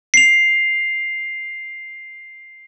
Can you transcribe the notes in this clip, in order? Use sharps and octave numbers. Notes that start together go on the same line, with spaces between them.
C7 F7